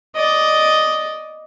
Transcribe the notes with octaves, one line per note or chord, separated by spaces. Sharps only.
D5 D#5